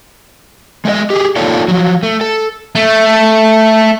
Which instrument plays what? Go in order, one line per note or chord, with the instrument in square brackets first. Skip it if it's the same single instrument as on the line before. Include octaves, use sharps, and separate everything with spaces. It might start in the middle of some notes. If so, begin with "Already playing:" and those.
[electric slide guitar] G#3 A3 C#5 D#5
G4 G#4
A#3 D#4 F4 A4 C#5 D5
F3 F#3
A3
A4
[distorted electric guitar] A3